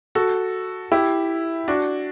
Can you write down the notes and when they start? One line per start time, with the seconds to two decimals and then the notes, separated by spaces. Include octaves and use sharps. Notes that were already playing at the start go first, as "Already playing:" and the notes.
0.15 F#4 A4
0.92 E4 G4
1.68 D4 F#4